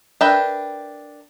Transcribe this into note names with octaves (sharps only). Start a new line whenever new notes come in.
D4 A#4 B4 E5 G5